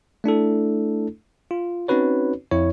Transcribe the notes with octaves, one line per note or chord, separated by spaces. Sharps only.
A3 D4 E4 A4
F4
C4 C#4 D#4 F#4 B4 C#5
F2 E4 C#5